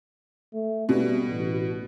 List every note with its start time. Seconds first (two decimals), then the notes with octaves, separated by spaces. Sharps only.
0.54 A3
0.89 B2 G3
1.28 A1